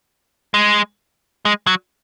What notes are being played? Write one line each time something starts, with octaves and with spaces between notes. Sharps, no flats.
G#3
G#3
F#3